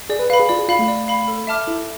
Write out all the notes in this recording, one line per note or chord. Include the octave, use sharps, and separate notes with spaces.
G#4 D5
B4
B4 F5 B5
G#4
F4 D5
G#4
F4 F5 B5
A3
D5
F5 B5
A4
E5 A5 D6 F6
E4 A4